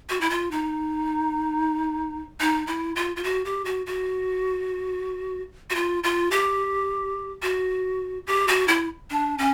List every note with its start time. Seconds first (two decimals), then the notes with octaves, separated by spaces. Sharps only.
0.09 F#4
0.21 E4
0.30 F4
0.51 D#4
2.40 D#4
2.67 E4
2.96 F4
3.16 F4
3.24 F#4
3.45 G4
3.65 F#4
3.86 F#4
5.70 F#4
5.75 F4
6.03 F4
6.31 G4
7.42 F#4
8.27 G4
8.48 F#4
8.68 E4
9.10 D4
9.38 C#4